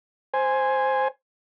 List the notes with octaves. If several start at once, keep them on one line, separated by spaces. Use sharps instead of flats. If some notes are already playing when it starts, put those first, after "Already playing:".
C5 G#5